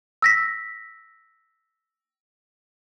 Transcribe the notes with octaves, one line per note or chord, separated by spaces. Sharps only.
E6 A#6 B6